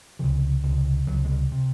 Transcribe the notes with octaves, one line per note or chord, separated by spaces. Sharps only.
C#2 C3 F3
C#2 C3
C#2 C3 F#3
G#3
G3
C3